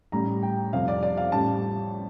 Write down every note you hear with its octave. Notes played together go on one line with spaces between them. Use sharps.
A1 A2 G3 A#5
G5
F2 C3 G3 F5
D5
D5
F5
A1 A2 G3 A5